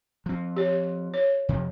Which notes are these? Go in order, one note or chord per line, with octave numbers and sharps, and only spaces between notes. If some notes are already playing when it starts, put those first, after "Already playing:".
F3 C4
G4 C#5
C#5
F2 C3 F3